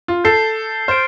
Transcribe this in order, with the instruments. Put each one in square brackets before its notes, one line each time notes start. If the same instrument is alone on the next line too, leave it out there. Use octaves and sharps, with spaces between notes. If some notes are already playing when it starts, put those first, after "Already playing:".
[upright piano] F4
[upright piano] A4 [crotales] G6 C7 G7
[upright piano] C5 [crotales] F6 A6 D7